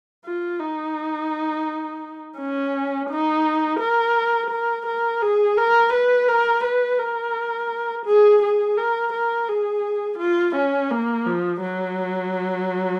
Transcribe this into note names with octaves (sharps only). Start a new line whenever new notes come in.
F4
D#4
C#4
D#4
A#4
A#4
A#4
G#4
A#4
B4
A#4
B4
A#4
G#4
G#4
A#4
A#4
G#4
F4
C#4
A#3
F3
F#3